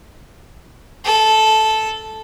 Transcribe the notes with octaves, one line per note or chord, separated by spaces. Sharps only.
A4